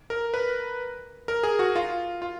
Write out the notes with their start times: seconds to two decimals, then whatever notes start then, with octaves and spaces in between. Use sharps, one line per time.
0.10 A#4
0.34 B4
1.28 A#4
1.43 G#4
1.59 F#4
1.76 F4
2.22 F4